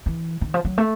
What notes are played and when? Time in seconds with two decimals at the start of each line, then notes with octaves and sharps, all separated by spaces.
0.06 E3
0.41 D#3
0.54 F3
0.65 F#3
0.78 A3